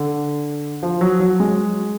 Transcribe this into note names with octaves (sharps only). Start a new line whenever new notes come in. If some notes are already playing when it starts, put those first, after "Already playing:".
Already playing: D3
F3
F#3
F#3
G#3